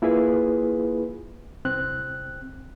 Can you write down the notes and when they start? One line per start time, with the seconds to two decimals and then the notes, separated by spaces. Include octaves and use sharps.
0.02 A#3 E4 F4 G#4 B4
1.65 C2 C4 F#6